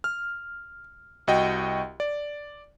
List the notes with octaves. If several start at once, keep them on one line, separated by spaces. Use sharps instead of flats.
F6
C2 F#4 D#5 G5
D5